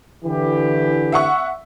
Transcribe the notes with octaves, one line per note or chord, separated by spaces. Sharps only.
D3 E3 G4
E5 F#5 C#6